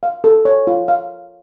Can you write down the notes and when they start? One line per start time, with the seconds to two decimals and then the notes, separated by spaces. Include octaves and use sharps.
0.03 F5
0.24 A4
0.45 C#5
0.67 F4
0.88 F5